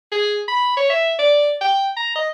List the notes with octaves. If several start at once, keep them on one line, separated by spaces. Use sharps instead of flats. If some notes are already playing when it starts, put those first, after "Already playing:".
G#4
B5
C#5
E5
D5
G5
A#5
D#5